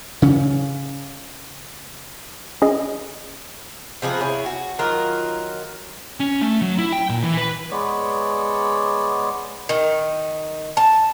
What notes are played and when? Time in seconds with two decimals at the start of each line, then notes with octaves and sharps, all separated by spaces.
0.22 C#3 C#4
2.62 C#4 G#4 D#5
4.02 C3 F3 G#4 B4
4.21 E4 G#4 C#5
4.46 F#4
4.79 D#3 F#3 F4 A#4
6.20 C#4
6.42 A3
6.62 F#3
6.78 E4
6.92 G5
7.09 A#2
7.22 E3
7.37 B4
7.71 G#3 B3 C#5 D5
9.69 D#3
10.77 A5